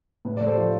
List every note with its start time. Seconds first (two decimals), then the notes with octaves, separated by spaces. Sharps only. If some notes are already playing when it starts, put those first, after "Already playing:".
0.25 A2 B4
0.37 A3 D5
0.47 A4 C5
0.57 F3